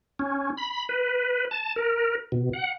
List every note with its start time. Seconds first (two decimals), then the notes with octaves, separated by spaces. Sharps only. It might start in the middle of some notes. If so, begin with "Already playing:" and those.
0.19 C#4
0.57 B5
0.89 B4
1.51 A5
1.76 A#4
2.32 B2
2.53 F#5